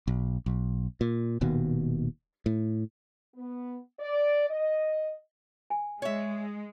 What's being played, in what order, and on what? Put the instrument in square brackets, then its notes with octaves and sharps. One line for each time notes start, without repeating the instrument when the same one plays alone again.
[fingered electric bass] B1
B1
A#2
D#1 D#2 B2
A2
[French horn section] B3
D5
D#5
[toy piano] G#5
[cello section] G#3 [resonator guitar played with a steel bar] C#5 E5